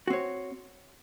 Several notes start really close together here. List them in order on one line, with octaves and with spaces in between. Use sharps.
F#4 C4 C#5